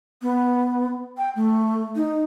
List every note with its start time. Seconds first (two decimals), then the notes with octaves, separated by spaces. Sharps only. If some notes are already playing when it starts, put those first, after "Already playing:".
0.22 B3
1.17 G5
1.36 A3
1.96 D#4